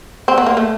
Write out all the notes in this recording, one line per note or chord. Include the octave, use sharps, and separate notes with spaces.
C4
B3
A#3
A3